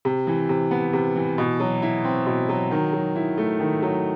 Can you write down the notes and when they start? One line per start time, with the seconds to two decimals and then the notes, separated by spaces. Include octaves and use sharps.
0.05 C3
0.27 E3
0.49 C3
0.71 B3
0.93 C3
1.16 E3
1.38 B2
1.60 F#3
1.82 E4
2.04 C4
2.27 B2
2.49 F#3
2.71 D#3
2.93 F#3
3.16 E4
3.38 A3
3.60 D#3
3.82 F#3